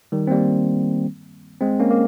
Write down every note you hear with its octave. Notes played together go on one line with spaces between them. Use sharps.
D#3 G3
C4
G3 A#3
G#3 C4
A#3 C#4
A#3